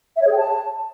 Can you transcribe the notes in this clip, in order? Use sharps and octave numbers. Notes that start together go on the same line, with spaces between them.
E5
C#5
G#4
G5
A5